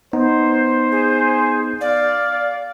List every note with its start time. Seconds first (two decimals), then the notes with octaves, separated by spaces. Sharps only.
0.13 B3 D#4 C5
0.91 G#4
1.81 D5 F5